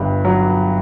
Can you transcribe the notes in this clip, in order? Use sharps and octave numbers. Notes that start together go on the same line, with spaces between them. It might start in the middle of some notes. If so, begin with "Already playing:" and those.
Already playing: G1 G2
F#3